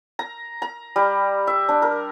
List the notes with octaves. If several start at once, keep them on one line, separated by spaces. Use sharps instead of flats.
A#5
A#5
G3
E5
D4
A#4